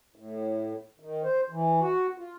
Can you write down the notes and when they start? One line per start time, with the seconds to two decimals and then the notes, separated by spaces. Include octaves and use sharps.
0.15 A2
1.00 D#3
1.23 C5
1.50 E3
1.80 F#4
2.18 F4